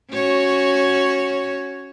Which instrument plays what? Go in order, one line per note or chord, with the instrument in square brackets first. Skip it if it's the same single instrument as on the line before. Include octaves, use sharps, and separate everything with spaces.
[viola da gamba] C#4 F#4 C#5